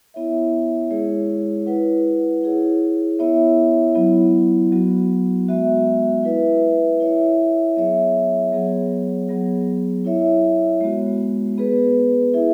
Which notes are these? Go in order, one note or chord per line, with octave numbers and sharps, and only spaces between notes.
B3 E4 C#5 E5
G#3 E4 G#4 C#5
E4 B4 F#5
E4 G#4 C#5
B3 E4 C#5 E5
F#3 B3 E4
F#3 B3 F#4
G#3 B3 F#4 E5
E4 B4 E5
E4 C#5 E5
F#3 B3 G#4 C#5 E5
F#3 B3 G#4 C#5 F#5
F#3 B3 G#4
E4 C#5 E5
G#3 B3 F#4
B3 G#4 B4
E4 G#4 E5